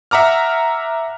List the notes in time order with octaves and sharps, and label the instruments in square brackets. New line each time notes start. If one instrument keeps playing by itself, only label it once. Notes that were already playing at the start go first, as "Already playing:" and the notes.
[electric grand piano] E5 F#5 A#5 D6 F6